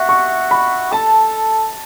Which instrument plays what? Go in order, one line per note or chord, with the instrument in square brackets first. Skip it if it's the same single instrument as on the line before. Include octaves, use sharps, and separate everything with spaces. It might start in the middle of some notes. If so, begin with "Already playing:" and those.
Already playing: [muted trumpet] F#4 [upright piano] E5
[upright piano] C#6
B5
[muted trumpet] A4 [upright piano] A5